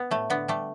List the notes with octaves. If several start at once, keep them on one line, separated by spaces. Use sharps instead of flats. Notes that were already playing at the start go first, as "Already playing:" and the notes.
Already playing: B3
A2 A3
D3 B3
G3 A3